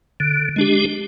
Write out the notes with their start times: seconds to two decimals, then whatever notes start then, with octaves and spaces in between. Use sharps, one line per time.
0.20 D3
0.56 G#3 D4 G4